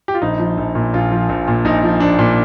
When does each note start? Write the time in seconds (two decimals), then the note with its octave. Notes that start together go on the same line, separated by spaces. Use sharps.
0.08 G4
0.14 F4
0.22 A#1 D#4
0.39 F3
0.57 A#1
0.75 A#2
0.93 A#1 F4
1.12 F3
1.29 A#1
1.48 A#2
1.65 A#1 D#4
1.83 F3
2.00 A#1 D4
2.19 A#2